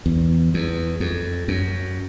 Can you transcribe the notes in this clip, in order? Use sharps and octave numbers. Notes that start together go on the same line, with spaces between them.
E2
E2
F2
F#2